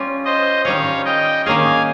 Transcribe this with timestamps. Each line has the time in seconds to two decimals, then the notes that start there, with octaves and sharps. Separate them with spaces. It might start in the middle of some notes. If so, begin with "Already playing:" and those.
Already playing: G3 C#4 F4
0.25 C5 D#5
0.65 D#3 G3 C#4 C#5 F5
1.05 D#5 G5
1.46 D#3 A#3 C#4 G#4 F5 G#5